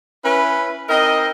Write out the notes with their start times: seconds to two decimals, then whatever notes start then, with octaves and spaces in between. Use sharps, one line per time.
0.25 C#4 E4 B4
0.89 C4 D#4 A#4 D#5